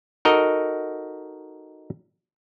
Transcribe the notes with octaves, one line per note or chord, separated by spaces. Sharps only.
D#4 F#4 A4 A#4 D#5